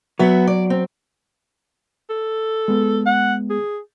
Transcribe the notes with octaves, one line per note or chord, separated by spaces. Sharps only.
F#3 B3 E5
D5
C4
A4
G#3 B3
F#5
G#4